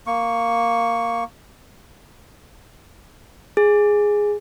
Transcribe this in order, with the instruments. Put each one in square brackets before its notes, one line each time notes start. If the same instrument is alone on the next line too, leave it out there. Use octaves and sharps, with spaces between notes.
[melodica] A#3 C#6
[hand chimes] G#4